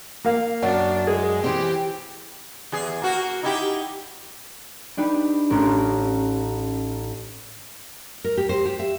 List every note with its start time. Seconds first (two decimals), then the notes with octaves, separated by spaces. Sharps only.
0.25 A#3 F5
0.62 F#2 D4
1.07 G#3 G#4
1.44 E3 C4 G4
2.72 E2 G#4
3.02 A#3 F#4
3.43 D#4 E4 G4
4.97 D4 D#4 G4 B4
5.50 A1 C#4 A#4
8.24 A#4
8.37 G4
8.49 C5
8.66 G4
8.79 E5